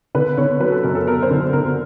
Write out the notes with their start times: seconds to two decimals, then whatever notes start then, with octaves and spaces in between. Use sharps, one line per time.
0.15 D3 B4
0.37 D3 C#5
0.60 F#3 B4
0.72 A4
0.83 F#2 A#4
0.95 A4
1.07 B3 A#4
1.22 C5
1.31 D3
1.53 D3 A#4